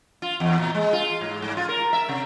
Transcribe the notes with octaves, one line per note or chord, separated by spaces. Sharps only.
F4
E2
A#2
G#3
F4
G#2
G#2
F4
A#4
E5
C3